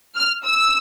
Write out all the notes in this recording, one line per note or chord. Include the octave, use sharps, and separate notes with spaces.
F6
E6